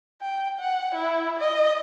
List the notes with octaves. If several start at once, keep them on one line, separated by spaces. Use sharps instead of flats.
G5
F#5
E4
D#5